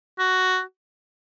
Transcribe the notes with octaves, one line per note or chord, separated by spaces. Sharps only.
F#4